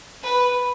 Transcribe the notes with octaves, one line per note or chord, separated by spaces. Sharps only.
B4